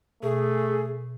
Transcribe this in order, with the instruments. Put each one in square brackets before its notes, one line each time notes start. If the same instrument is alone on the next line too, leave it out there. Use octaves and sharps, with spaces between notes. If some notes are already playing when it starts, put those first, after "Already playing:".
[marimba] B2 [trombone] A3 [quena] G#4